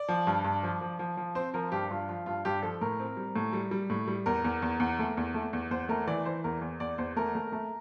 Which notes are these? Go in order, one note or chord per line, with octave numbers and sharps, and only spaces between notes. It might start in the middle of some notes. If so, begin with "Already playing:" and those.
Already playing: D5
F3
G2
G2
F3
F3
F3
F3
C4 C5
F3 A#4
G2 G4
G2 F4
F3 F4
G2 F4
G2 G4
F3 A4
A2 A#4
C4
G3
A2
G3
G3
A2
G3
E2 A#4
E2
E2
E2
A3
E2
A3
E2
E2 C5
A3 A#4
E3 D5
E3 C5
E2 A#4
E2
E2 D5
E2 C5
A3 A#4
A3
A3